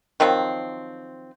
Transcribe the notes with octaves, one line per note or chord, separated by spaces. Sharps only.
D#3 F3 F#3 C4